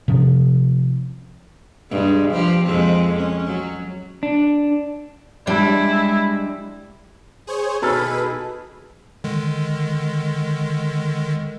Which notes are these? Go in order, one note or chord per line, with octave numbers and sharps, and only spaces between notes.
C3 F3 C#4
G2 G#3
F3 G4
F2 G#3 C4
C#4
F#3
D4
G3 G#3 D4 E4 D5
G#4 C5 C#5
B2 D#4 G#4 A4 B4 B5 F6
D3 D#3 G#3